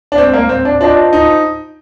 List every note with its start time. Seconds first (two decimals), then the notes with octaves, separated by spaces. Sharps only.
0.12 D4
0.18 C4
0.34 A#3
0.49 C4
0.65 D4
0.81 D4 F4 C5 D#5 A5
1.13 D#4